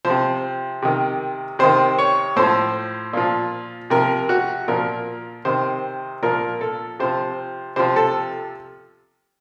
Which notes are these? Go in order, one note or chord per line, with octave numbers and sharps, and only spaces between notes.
F3 C5
C3
C3 D#3
C3 D#3 C5
C#5
A2 F3 C5
A#2 F3
C3 F3 A#4
F#4
A#2 F3 A#4
C3 D#3 C5
A#2 F3 A#4
A4
C3 F3 C5
C3 F3 C5
A4